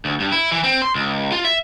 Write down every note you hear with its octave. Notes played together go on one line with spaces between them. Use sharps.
D2
G2
E4
E3
C4
C6
C#2
F4
E5